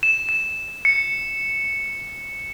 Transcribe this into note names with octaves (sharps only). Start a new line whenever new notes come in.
E7
E7
C#7